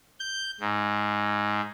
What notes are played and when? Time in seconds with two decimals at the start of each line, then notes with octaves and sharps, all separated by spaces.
0.20 G6
0.60 G#2